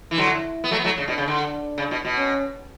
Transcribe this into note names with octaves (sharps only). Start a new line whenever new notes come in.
E3
D3 F#3 E4
B3
F#3 A3
B3
F#3 A3
C#3 D4
B2
C#3
D3
D4
C#3
B2
B2
C#4